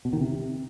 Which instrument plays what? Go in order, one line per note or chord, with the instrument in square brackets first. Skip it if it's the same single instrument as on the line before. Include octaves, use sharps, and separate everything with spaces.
[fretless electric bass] B2
D#3
C3